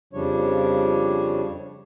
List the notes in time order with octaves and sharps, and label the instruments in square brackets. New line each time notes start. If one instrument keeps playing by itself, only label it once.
[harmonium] F2 C#3 F3 G3 D4 C#5